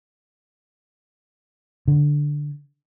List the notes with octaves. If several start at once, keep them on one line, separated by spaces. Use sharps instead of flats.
D3